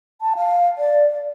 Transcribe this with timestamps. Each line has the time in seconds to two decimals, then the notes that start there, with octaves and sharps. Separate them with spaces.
0.21 A5
0.36 F5
0.78 D5